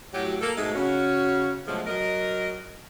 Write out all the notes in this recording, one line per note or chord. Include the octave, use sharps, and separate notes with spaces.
A2 F#3 G4
A#3 A4
G#2 B2 G#3 A3
C#3 C#4 F#4
B2 D3 F3 F#3 G#3 A3
F#3 A#4 D#5